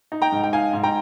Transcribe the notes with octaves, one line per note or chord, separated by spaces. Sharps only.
D#4
G5 A#5
G#2
G5
D#4 F5 G#5
G#2
G5 A#5